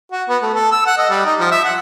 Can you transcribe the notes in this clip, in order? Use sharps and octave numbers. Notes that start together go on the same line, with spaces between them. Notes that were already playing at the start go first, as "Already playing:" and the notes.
F#4
B3
A3
A4
E6
F#5
D#5
G3
D#4
F3
E5
F#5